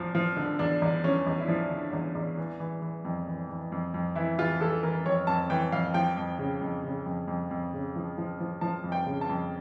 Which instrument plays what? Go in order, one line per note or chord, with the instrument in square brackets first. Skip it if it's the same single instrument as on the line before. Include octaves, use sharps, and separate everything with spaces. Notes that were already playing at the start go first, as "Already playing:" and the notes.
Already playing: [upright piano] E2 F3
F3
D3
E2 D4
E2
F3 C#4
E2
E4
F3 D4
D3
E2
E2
E3
E3
E3
F2
E3
E3
F2
F2
E3 E4
E3 F4
E3 A4
E3 A#4
F2 C#5
F2 A5
E3 G5
F2 F5
F3 G5
F2
C#3
F2
C#3
F2
F2
F2
C#3
F3
F3
F3
F3 A5
F2
G5
C#3
A5
F2